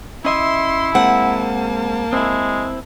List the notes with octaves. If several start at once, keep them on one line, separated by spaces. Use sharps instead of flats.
C#4 E4 D#5 E5 C6
G#3 A#3 C4 F#5 A5
G#3 C4 E4